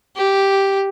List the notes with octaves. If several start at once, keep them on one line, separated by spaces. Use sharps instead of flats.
G4